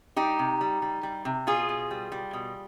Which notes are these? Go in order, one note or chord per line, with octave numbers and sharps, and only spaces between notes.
G3 D#4 G4
C3
G3
G3
G3
C3
B2 F4 G#4
B2
G3
G3
B2